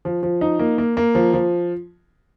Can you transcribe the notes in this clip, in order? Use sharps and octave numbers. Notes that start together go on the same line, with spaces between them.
F3
F3
D#4
A#3
A#3
A#3
F3
F3